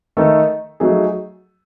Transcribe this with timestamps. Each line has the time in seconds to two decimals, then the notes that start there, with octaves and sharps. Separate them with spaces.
0.17 D#3 A3 D#4 A4
0.80 F#3 A3 D#4 G#4